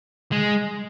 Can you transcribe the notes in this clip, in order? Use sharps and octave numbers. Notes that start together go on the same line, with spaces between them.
G#3